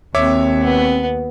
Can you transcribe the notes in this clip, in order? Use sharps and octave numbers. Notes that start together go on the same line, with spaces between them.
D#2 C4 C#5 E5 D6
B3